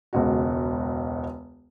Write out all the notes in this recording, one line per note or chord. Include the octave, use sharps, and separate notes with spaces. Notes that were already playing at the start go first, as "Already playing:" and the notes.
E1 C#2 F#4